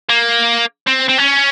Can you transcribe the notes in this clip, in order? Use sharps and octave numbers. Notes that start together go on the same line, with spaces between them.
A#3
C4
C4
C#4